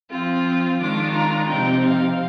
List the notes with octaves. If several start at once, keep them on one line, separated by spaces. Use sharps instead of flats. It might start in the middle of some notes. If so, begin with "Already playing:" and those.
F3 C4 F4
D#3 G#3 D4 F4 D6
A#5
C3 F3 C4 D#4 G5
F5